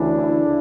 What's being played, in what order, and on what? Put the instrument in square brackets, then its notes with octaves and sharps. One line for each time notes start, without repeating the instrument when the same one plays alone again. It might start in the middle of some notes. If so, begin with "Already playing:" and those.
Already playing: [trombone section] D2 C#3 E3 D4 E4